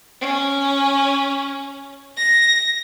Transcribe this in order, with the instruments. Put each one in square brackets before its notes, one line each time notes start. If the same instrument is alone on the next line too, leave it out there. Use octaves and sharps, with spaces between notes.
[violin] C#4
A#6